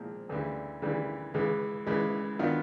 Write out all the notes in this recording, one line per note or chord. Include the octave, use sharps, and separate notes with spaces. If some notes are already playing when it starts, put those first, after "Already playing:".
Already playing: A#2 F3 G#3 C4
D2 C#3 E3 G3
D2 C#3 E3 G3
C#2 C#3 E3 G#3
C#2 C#3 E3 G#3
D#3 F#3 B3 D4 F4